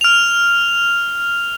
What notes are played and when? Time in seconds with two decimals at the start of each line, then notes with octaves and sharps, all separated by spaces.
0.01 F6 F7